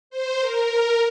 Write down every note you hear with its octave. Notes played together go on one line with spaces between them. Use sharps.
C5
A#4